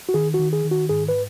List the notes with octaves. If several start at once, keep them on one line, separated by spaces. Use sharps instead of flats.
F#4
D#3 G#4
F#4
D#3
G#4
D#3
F#4
G#2 G#4
B4